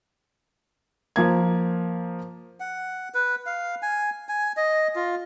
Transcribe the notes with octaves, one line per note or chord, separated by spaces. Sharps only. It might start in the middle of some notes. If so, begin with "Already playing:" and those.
F3 A#3 G#6
F#5
B4
F5
G#5
G#5
D#5
F4